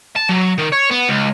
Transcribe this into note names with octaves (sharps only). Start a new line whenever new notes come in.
A5
F#3
D#3
C#5
B3
C#2